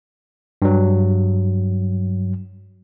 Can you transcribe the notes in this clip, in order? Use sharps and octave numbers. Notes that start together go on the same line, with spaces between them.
G2 F#3